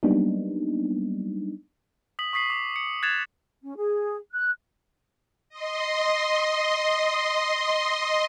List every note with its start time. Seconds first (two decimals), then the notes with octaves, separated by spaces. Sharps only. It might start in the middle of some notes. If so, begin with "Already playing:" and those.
0.03 F#3 G3 A#3 B3 D4 D#4
2.19 D#6 B6 F#7
2.33 C#6 D#6 B6 C7 F#7
2.50 D6
2.76 C#7
3.03 F#6 G#6 A6 C7 E7 F7
3.63 C#4
3.77 G#4
4.31 F#6
5.49 D#5 C6